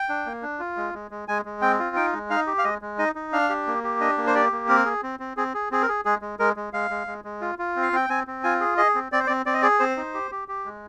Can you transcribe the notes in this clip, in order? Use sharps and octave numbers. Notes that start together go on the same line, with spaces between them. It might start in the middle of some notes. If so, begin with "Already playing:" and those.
Already playing: G5
D4
A#3
D4
F4
G#3
G#3
G#3
G#3 G#5
G#3
C4 G5
F4
D#4 G5
G#3
D#4 F5
G4
F5
G#3 D#5
G#3
D#4 D#5
D#4
D4 F5
G4
A#3
G4
D4 D#5
A#3
C5
G4 D5
A#3
C4 A#4
G#4
C4
C4
C4 G#4
G#4
C4 G#4
A#4
G#4
G#3 G#4
G#3
G#3 A#4
G#3
G#3 F5
G#3
G#3
G#3
F4
F4
C4
F5
C4 G5
C4 G#5
C4
F4 G#5
G#4
G#4 D#5
C4
C4 D5
C5
C4 D5
C4 D5
D#5
G#4 D5
C4 C5
D#4
G4
G4
G4
G#3